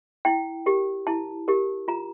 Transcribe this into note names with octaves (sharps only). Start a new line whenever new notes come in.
E4 G5
G4 A#4
E4 A5
G4 A#4
F4 A#5